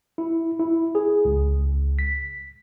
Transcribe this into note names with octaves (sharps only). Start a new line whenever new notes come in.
E4
E4
G#4
C#2
B6